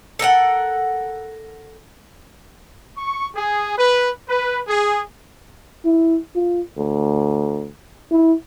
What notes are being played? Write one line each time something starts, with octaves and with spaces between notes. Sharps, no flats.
A4 A#4 F5 F#5
C#6
G#4
B4
B4
G#4
E4
F4
D2
E4